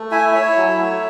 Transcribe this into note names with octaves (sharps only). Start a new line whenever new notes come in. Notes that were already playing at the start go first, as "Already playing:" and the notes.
Already playing: A3
E4 E5 G#5
E4 C#5 E5
F#3
A3